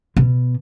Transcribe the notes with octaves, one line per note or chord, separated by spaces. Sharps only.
B2